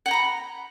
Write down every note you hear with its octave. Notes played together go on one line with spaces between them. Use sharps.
F#5 G5 A#5 B5